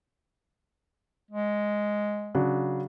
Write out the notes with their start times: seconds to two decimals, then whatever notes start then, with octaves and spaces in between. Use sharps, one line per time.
1.31 G#3
2.35 C#3 F#3 D4